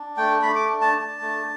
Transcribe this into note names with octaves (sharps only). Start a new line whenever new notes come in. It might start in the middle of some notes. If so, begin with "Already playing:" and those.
Already playing: D4
A3 G5
A3 B5
D6
D4
A5
D4
A3